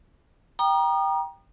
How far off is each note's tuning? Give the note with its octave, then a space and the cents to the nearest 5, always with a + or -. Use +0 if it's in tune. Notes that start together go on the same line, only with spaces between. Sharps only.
G5 +0 A#5 +25 D#6 -35